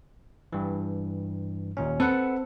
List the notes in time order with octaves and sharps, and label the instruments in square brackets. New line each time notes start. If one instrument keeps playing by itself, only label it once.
[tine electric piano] G2 E3
D#2 A#2 C#4
[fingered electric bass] C4 [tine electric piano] A4 B4 F#5